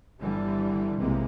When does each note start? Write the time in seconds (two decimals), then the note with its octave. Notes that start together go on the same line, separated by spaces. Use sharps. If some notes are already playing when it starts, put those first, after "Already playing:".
0.19 G1 D3 E3 G3
0.96 B1 C3 E3 G#3 A#3